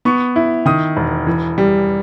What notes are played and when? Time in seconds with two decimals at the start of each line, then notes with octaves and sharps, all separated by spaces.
0.05 B3 C#6
0.36 E4
0.66 D#3 D#6
0.97 E1
1.27 E3
1.58 G3